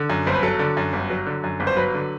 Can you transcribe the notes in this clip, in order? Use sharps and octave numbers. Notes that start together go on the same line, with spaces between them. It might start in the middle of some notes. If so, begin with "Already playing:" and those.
Already playing: D3
F#2
G1 C5
B4
F#3 A4
D3
F#2
G1
F#3
D3
F#2
G1
C5
F#3 B4
D3